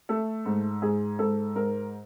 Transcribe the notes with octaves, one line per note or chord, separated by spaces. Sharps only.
A3 A4
G#2
G#2 G#4
G#2 A4
G#2 A#4